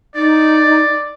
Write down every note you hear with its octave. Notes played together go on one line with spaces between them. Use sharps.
D#4 D5